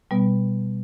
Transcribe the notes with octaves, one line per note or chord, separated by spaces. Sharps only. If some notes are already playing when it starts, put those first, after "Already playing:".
B2 G3 B3